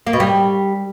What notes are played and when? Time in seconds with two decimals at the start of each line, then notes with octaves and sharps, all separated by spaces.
0.07 A#3
0.13 B2
0.20 G3